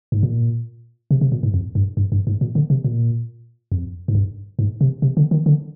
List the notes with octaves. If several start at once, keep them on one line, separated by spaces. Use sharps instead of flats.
G#2
A#2
C3
C3
A#2
G#2
F2
G2
G2
G2
G#2
A#2
D3
C3
A#2
F2
G#2
G2
G#2
C3
C3
D3
D#3
D3